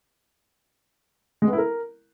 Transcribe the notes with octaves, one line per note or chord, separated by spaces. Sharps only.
G#3
B3
E4
A#4